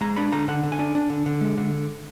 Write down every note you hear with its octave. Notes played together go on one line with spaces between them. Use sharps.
G#3 A#5
D4 B5
D3 A#5
D3 F#5
D3
G#5
D4
D4
D3
D3
G#3
D3